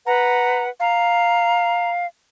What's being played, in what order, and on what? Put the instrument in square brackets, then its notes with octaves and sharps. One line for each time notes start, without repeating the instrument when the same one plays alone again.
[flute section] B4 F#5 [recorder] A#5
[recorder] F5 [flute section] A#5